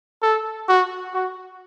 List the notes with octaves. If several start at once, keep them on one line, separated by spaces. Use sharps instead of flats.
A4
F#4
F#4